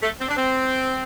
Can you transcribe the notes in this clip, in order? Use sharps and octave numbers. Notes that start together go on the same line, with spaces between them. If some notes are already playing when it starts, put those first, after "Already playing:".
A3
C4
D4
C4